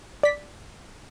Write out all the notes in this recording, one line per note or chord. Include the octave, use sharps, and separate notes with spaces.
D5 B6